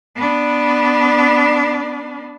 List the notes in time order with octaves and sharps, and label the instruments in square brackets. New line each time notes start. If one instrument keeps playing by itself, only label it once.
[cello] B3 D4